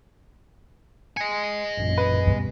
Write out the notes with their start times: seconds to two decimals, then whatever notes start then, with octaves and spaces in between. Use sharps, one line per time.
1.17 D#5 G#5 C#7
1.77 A1 F#2 A#2
1.98 B4
2.27 G2 B2